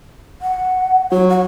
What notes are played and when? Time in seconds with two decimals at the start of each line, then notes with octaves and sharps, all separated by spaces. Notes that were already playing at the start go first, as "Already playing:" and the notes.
0.42 F#5
1.11 F#3 C#5
1.30 F#5